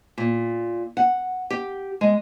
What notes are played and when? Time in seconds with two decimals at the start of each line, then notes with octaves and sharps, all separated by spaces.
0.18 A#2
0.97 F#5
1.50 G4
2.01 G#3